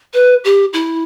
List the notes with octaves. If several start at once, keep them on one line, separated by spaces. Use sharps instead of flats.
B4
G4
E4